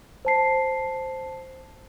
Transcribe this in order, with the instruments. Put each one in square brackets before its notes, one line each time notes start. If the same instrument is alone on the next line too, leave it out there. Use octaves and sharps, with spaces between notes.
[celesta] C5 A5 C7